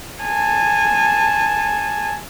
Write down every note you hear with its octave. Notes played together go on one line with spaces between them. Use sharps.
G#5 A5